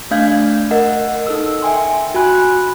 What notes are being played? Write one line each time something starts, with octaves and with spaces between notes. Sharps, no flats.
A3 D4 D5 F5 G6 G#6
A#4 D#5 F#5
D#4 A4 E6
E5 G5 G#5 C6
F#4 G#5 B5 F#6